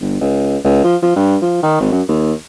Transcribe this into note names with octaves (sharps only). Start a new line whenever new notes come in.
G1
C#2
C#2
F3
F3
G2
F3
D#3
G#1
F#2
D#2